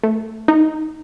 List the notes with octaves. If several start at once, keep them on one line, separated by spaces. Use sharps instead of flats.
A3
D#4